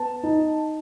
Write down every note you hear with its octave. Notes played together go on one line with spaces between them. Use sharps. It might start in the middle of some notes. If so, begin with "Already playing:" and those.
Already playing: B3 A5
D#4